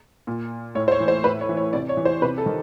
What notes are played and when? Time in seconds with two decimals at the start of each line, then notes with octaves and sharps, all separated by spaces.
0.27 A#2
0.75 A2 C#5
0.88 C5
0.92 C#5
1.00 E3
1.08 C5
1.24 A2 B4
1.41 C#5
1.49 E3
1.57 C#5
1.73 C3 D5
1.89 C#5
1.97 E3
2.05 C5
2.22 C3 B4
2.38 A4
2.46 D#3